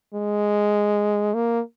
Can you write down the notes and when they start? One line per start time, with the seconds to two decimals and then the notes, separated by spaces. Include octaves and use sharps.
0.14 G#3
1.34 A#3